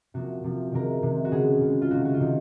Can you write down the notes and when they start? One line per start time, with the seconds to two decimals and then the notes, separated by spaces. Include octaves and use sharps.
0.14 C3 F3 A#3 F#4
0.44 C3 F3 A#3
0.72 C3 D#3 G#3 A#4
1.03 C3 D#3 G#3
1.25 F#4
1.32 C#3 G#3 G#4
1.61 C#3 G#3
1.82 F4
1.90 C3 D#3 F#3 F#4
2.05 F#4
2.14 F4
2.20 C3 D#3 F#3 D#4